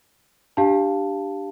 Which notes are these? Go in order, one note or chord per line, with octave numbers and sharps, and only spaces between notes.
D4 G4 F5 A5